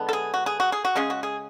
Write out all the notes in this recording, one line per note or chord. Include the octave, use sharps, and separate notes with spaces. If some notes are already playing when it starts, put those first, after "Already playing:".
Already playing: D3 G#3 B3 D4
A4
G#4
F#4
G#4
F#4
G#4
F#4
C#3 G#3 C#4 G#4
F#4
G#4